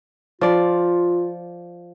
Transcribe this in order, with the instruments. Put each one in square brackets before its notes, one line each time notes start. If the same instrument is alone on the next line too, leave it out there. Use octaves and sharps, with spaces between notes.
[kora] F3 D5 [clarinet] F4